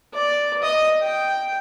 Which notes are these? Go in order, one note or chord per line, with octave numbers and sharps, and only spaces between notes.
D5
D#5
G5